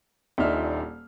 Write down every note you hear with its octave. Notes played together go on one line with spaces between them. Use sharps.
D#1 A#2 D4 D#4 E5 F6